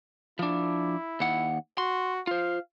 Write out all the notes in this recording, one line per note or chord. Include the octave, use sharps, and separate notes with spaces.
F3 D4 E4
D#2 F#5
F#4 C6
F4 C5 F5